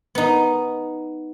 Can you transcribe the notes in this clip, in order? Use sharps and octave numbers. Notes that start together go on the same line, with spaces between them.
B3 D#4